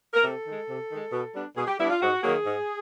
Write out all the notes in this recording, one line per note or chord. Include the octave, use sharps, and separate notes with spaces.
A#4
C3 A4
D#3 G#3
C3
D#3 G#3
B2
G3 B3 D4
B2 G#4
G4
G3 B3 D4 E4
F4
G#2 F#4
D#3 F#3 A#3 G#4
G#2